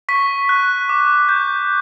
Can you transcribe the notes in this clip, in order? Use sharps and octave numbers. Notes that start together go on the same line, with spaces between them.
C#6 B6
F#6
D6
G6